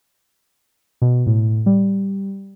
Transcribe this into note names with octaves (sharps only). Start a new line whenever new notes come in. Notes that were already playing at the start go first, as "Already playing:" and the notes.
B2
A2
G3